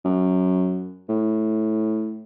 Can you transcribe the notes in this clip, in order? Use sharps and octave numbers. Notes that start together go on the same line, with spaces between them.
F#2
A2